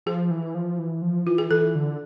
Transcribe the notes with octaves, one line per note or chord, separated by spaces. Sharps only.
F3 G#4
E3
F3
E3
F3
E3 F4
G#4
E3 A4
D3